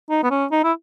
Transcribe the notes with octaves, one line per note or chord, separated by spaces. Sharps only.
D#4
B3
C#4
D#4
E4